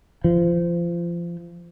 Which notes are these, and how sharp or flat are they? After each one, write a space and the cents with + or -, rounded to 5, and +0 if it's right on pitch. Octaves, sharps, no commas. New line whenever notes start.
F3 -25